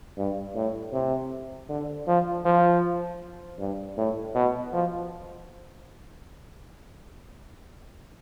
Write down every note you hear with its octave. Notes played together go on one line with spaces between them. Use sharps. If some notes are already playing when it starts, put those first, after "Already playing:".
G2
A2
C3
D3
F3
F3
G2
A2
B2
F3